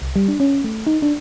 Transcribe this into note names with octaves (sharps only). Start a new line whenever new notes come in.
C2
G3
D4
C#4
A3
D#4
D4